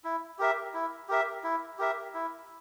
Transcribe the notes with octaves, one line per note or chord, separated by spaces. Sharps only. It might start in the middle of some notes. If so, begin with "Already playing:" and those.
E4
G4 A#4 E5
E4
G4 A#4 E5
E4
G4 A#4 E5
E4